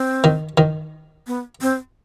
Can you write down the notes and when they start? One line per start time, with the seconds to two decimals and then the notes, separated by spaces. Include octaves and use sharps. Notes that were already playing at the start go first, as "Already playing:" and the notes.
Already playing: C4
0.24 D#3
0.58 D#3
1.27 B3
1.62 C4